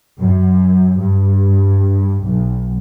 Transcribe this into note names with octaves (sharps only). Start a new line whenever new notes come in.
F#2
G2
B1